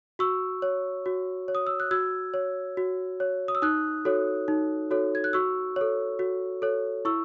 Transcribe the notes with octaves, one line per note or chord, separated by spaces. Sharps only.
F#4 C#6 E6
C#5
F#4
C#5
D#6
E6
F#6
F#4 E6 G#6
C#5
F#4
C#5
D#6
E6
D#4 D#6 F#6
F#4 A4 C#5
D#4
F#4 A4 C#5
G#6
F#6
F#4 C#6 E6
A4 C#5
F#4
A4 C#5
E4 C#6 E6